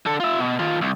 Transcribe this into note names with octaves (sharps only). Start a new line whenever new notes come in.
D3 A4
F4 E5
B2
D#3 F4
C2